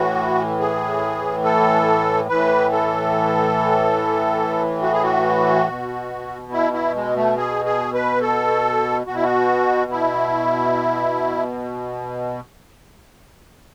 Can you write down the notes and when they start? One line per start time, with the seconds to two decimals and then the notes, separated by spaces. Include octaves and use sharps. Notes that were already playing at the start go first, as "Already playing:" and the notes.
Already playing: A2 E3 F#4
0.60 G#4
1.44 A4
2.29 A2 E3 B4
2.72 A4
4.83 F#4
4.93 G#4
5.03 F#4
5.68 B2
6.52 E4
6.73 E4
6.95 G#3
7.16 A3
7.37 G#4
7.65 G#4
7.94 B4
8.21 A4
9.07 B2 F#4
9.15 E4
9.23 F#4
9.91 E4